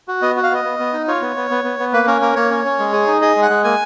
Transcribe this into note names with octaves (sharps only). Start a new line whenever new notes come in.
F#4
B3 D#5
F#4
F5
B3 D#5
B3
B3
D#4
F4 C#5
B3
B3
B3
B3
B3
A#3 B4
C#4 A#4
A#3 A#4
A#3 C#5
C#4
C#4
G#3
G#4
D#4
G#4 D#5
G#3
F#5
G#3
A#3 G#5